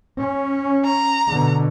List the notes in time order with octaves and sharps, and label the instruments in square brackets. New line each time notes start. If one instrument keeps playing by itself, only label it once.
[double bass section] C#4
[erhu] A#5
[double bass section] B2 D3